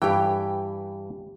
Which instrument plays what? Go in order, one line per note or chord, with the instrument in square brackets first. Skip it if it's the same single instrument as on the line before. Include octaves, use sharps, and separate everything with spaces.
[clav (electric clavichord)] G2 E3 [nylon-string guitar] G4 G5